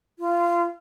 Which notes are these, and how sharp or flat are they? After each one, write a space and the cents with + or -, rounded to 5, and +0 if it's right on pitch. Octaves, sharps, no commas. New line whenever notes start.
F4 -20